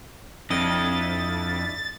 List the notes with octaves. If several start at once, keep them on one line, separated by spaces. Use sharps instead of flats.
F2 D4 E4 D#5 A6